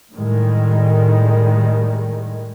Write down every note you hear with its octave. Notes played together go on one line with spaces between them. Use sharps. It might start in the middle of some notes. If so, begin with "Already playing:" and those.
A2 D#3 G3 G#3